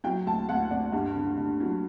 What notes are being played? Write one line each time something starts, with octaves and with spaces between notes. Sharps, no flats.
F#3 G5
D2 A5
D2 F#5
D2 D5
G2
D3
D3
F#3